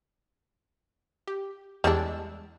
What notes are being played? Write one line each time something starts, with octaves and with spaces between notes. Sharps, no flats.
G4
E2 G3 G#3 D4 E6